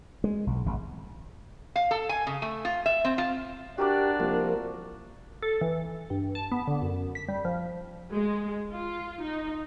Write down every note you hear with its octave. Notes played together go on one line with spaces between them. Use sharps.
G#3
B1
G#1
F5
A4
G#5
C#3
A3
F4
E5
C4
F4
D4 F#4 G4 A#4 D5
C2 F3 A#3
A4
E3
G2
A5
B3
D3
F#2
B6
G3
F3
G#3
F4
D#4